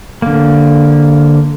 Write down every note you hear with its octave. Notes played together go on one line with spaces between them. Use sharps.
D3 A#3